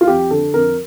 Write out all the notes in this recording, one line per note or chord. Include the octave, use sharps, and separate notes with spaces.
F4
F2 G4
D3 A4
F2 A#4